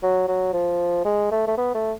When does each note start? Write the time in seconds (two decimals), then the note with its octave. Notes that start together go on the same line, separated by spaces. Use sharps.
0.03 F#3
0.28 F#3
0.53 F3
1.05 G#3
1.31 A3
1.47 A3
1.58 B3
1.75 A3